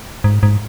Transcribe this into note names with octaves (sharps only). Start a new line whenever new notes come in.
G#2
G#2